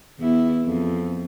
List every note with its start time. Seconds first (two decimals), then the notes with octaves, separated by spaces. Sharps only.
0.19 E2 E4
0.65 F2